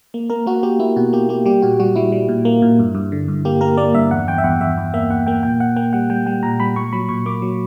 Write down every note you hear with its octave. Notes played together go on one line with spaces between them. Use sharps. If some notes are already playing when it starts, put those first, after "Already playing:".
A#3
A#3 A#4
A#3 F#4
A#3 G4
A#3 E4
B2 F#4
A#3 G4
A#3 G4
G3 G4
A#2 F#4
G3 F#4
G3 E4
G3
A#2
A#3
A#2
G2
G2
D3
G2
A#3 G4
A#3 A#4
A#3 D5
G2 E5
E2 F#5
E2 G5
E5
E2 F#5
E2 E5
E2
A#3 E5
E2 F#5
A#3 G5
A#2 G5
A#2 F#5
A#3 G5
G3 F#5
G3 G5
G3 G5
A#2 A#5
G3 B5
A#2 C#6
F#3 B5
A#2 C#6
A#3 D6
F#3